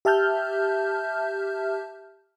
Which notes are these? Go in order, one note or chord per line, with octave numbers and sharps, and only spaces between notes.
G4 E5 A5 F6 G6